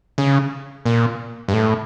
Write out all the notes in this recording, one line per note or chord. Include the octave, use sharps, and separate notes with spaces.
C#3
A#2
G2
A2